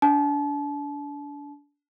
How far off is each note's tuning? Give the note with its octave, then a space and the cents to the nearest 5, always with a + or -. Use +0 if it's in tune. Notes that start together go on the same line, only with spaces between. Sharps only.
D4 -30 A5 -35